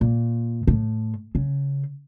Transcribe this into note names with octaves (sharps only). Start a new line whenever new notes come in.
A#2
A2
C#3